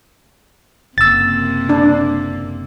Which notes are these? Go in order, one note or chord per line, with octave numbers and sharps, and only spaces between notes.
F#1 C3 A#3 E6 A6
D4